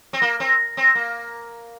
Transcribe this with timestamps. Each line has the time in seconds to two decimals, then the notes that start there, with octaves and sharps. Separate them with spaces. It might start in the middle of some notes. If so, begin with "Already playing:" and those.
0.13 C4
0.22 A#3
0.40 C4
0.77 C4
0.95 A#3